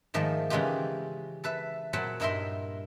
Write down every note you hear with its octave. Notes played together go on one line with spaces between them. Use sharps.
G#2 D#3 F3 A3 D#5
C#3 E3 G#3 D#4 F4 G4
A4 B4 E5
A#2 F#3 C5 F#5 A5 B5
G2 D#4 E4 A#4 E5 C6